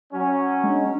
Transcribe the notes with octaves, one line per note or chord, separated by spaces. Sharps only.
F#3 C#4
G#3 D4